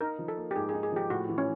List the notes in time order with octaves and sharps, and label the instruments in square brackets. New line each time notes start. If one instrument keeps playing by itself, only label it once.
[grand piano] D#4 [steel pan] A#4
[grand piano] F3
[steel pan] A4
[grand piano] A#3
[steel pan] G4
[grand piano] G#2 [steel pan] G#4
[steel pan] G#4
[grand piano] D#4
[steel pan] G#4
[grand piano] F3 [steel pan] G4
[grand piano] A2 [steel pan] F#4
[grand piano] E3
[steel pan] C#4